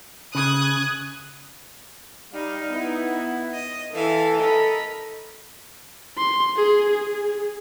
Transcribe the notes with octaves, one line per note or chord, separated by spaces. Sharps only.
C#3 D#6 F#6 G#6
G3 D#4 F5
B3 E4
D#5
E3 A4 E5 F5
A#4 D#5 B5
C6
G#4
G#4